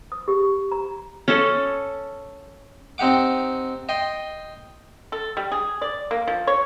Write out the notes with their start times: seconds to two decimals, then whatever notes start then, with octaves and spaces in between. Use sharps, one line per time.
0.12 D#6
0.28 G4
0.72 A#5
1.28 C#4 A4
2.98 C4 D#4 G4 F#5 D6
3.89 D#5 G5 C6
5.12 A4
5.37 G3
5.52 G#4
5.82 D5
6.11 A#3
6.28 F3
6.47 C#5